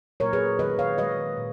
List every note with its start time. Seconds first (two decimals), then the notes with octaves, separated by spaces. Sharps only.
0.20 A#2 F#3 A#3 A#4 C#5
0.33 G#4 B4
0.59 D#3 G#3 B4 D#5
0.79 C#5 F5
0.98 D#3 G#3 B4 D#5
1.37 A#2